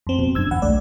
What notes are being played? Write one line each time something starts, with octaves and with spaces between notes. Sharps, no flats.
F2 C4
B2
G1 F#2 D4 E6 G#6
E2 F#5
B1 A3 D5